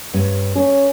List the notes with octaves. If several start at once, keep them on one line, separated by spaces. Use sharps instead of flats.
G2 C#4
C#4 G#4